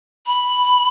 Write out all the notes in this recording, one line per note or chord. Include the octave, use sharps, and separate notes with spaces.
B5